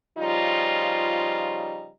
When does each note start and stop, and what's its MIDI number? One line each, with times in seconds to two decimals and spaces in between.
0.18 1.89 49
0.18 1.89 53
0.18 1.89 55
0.18 1.89 63
0.18 1.89 65